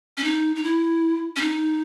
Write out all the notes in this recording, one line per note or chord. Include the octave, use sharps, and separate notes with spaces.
C#4
D#4
D#4
E4
C#4
D#4